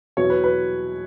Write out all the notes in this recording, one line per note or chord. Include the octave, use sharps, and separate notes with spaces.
E2 B2 F#3 C#5
B4
B4